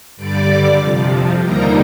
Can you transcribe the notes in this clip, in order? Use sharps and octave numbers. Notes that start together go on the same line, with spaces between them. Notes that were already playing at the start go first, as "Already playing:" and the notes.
G2 D3 G3 D5 D6
F2 C3 F3
D#2 D3 G3 A#3 D#4 A#4 A#5